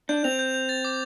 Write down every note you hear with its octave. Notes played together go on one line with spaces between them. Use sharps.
D4 G6
C4 F7
G6
G6
A6
D6